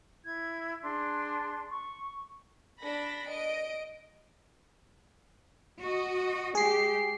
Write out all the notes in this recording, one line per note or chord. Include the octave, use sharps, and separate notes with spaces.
E4 G#6
D4 G#4 A5 C6
C#6
D4 B5 A#6
D#5 D7
F#4 D#5
G#3 G4 G#4 C7